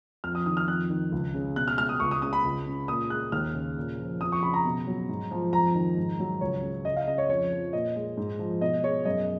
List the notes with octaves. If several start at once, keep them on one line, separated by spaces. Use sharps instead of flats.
F2 F6
D#6
D#3 D#6
F6
F2 F#6
D#3
C#2
C#3
B2 F#6
F6
G#3 F6
D#6
C#2 C#6
D#6
C#3 D#6
B5
C#2
C#3
A#2 D#6
G#3 F#6
D#2 F6
C#3
A#2
F3
F2 D#6
C#6
C#3 B5
A#5
B2
F#3
G#2
F3
F2 A#5
D#3
G#2
F#3
C#2 C#5
C#3
C#2 D#5
F5
C#3 D#5
C#5
F2 C#5
F3
A#2 D#5
G#3
G#2
F3
B2 D#5
G#3 C#5
F#2 D#5